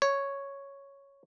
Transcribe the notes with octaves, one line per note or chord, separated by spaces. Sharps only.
C#5